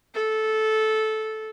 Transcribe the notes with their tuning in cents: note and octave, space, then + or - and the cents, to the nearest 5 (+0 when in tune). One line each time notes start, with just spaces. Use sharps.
A4 -15